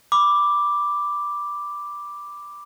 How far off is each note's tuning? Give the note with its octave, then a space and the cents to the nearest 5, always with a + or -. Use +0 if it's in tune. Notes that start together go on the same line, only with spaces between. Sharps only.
B5 +0 D6 +0